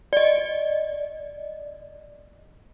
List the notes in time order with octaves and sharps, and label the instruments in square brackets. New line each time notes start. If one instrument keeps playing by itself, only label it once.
[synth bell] D5 D#5